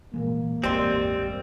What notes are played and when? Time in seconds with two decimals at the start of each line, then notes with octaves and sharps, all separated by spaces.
0.14 A#2 E3 G#3 A#3
0.64 A1 E2 G2 G3 G#3 C4 C6